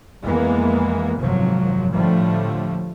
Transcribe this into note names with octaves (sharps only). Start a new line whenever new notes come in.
F2 E3 G#3 A#3 B3
G#1 F#2 C3 F3 F#3
A2 D3 F3 G3 A3